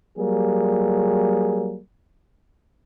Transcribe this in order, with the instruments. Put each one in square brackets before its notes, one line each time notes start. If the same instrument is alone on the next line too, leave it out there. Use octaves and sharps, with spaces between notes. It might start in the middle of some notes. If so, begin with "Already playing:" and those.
[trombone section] F#3 G3 A#3 G#4